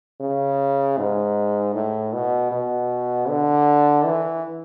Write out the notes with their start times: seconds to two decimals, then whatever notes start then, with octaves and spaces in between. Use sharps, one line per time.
0.20 C#3
0.98 G#2
1.74 A2
2.13 B2
2.51 B2
3.28 D3
4.05 E3